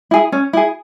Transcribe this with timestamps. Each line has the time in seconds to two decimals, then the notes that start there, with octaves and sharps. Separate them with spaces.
0.11 E4 G#4
0.32 C#4
0.53 E4 G#4